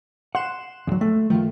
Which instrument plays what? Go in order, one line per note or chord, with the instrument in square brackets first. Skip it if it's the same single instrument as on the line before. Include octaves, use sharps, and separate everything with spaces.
[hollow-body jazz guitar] F#5 [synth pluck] C6 F#6 E7
[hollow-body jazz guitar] E2 F#3
A3
[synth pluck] G2 F3 A3 [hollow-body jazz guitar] D#3 F4